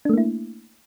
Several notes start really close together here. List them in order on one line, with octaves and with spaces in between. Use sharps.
D4 A3 A#3 E4